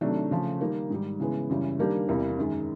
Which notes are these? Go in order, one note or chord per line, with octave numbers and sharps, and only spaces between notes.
C3 D#3 F#3 A3 D4
C#3 F3 A3
D#3 G3 A#3 D#4
G#2 D#3 G3
C#3 E3 G#3 B3
F#2 C#3 E3 G3
D#3 G3 A#3 D4 G4
E2 C3 E3 G3 A#3
F#2 D#3 G#3